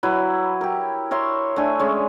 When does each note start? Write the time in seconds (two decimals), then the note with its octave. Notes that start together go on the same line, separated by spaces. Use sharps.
0.03 F#3 E4 B4
0.61 G4 A#4
1.11 A#4 C#5 E5 C6
1.56 A3 D4 G#5
1.79 G#3 C#4